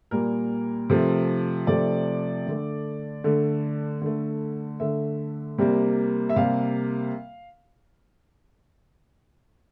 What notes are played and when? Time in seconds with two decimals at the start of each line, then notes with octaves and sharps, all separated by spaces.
0.11 A#2 G3 A#3 A#4
0.90 C3 F3 A3
1.67 C3 F3 A3 D5
2.46 D3 A3
3.24 D3 A3
4.02 D3 A3
4.80 D3 A3 E5
5.58 C3 G3 A#3
6.29 E5
6.36 C3 G3 A#3 F5